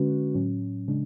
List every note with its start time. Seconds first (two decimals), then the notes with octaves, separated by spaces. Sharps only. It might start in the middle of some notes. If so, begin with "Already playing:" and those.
Already playing: D3 G#3 C#4 F#4 B4
0.34 A2 F#3 C#4
0.88 C#3 G#3 D4